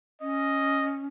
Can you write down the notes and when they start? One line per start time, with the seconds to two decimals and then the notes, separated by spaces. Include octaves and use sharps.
0.22 C#4 D#5